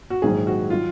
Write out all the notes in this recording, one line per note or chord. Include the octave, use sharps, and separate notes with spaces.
F#4
A#1 G#2 D#3 F#3 G#4
F#4
D#3 F#3 F4